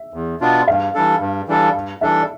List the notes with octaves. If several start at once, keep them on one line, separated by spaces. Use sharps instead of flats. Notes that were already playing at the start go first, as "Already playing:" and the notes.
Already playing: E5
E2
B2 B3 D4 F4
G2 F5
E3 G3 D4 A4
G2
E3 G3 D4 A4
G2
E3 G3 D4 A4 E5